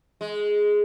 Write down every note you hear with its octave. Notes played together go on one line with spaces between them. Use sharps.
G#3